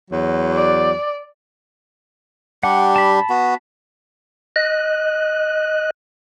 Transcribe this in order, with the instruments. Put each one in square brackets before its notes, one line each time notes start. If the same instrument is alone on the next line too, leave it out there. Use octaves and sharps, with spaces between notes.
[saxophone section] E2 F#3
[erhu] D5
[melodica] G3 D4 G4 [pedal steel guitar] F#5
[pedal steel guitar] A5 B5
[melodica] B3 F#4
[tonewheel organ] D#5 F#6